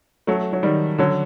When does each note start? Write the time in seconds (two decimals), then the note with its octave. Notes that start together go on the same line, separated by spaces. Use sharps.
0.27 F#3 A3
0.53 F#3
0.63 D#3 G3
0.98 D3 F#3